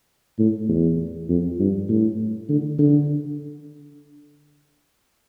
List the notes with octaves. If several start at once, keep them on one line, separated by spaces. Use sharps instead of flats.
A2
E2
F2
G2
A2
D3
D3